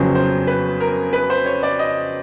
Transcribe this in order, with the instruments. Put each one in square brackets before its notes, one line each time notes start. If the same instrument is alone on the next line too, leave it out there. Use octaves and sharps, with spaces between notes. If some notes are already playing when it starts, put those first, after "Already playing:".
Already playing: [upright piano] F2 C#3 F#3 B3 [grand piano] C5
[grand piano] C5
B4
A#4
B4
C5
C#5
D5
D#5